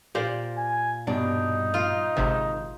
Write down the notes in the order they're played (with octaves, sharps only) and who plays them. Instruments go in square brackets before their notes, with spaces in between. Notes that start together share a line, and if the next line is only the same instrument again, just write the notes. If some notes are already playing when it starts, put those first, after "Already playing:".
[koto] A#2 [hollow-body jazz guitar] G4 C5 D5
[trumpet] G#5
[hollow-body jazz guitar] G2 B2 D4 [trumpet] D#4
[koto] F4
[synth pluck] G#1 C3 [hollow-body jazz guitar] D#3